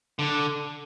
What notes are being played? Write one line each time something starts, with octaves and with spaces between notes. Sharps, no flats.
D3